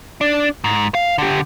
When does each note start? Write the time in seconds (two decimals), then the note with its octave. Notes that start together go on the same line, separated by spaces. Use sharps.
0.21 D4
0.64 G#2
0.95 F5
1.18 D3 G4